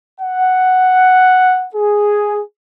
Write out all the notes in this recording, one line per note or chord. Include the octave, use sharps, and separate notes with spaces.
F#5
G#4